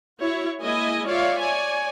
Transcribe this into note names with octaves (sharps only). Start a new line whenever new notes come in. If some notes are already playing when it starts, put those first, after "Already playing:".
E4 F#4 C#5
G#3 A#3 E4 D#5 E5 G#5
F4 C#5 D5 E5 F5
C#5 D5 G#5